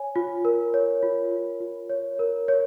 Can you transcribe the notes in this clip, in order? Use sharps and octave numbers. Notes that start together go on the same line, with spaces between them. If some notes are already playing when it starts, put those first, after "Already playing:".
Already playing: C#5 G#5
F4
A#4
C#5
F4
F4
F4
C#5
A#4
C#5